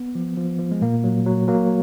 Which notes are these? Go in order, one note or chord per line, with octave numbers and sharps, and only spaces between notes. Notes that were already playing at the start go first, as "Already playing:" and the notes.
Already playing: B3
F3
F3
F3
G#3
A#2 A#3
F#3
F#3
F#3 A#3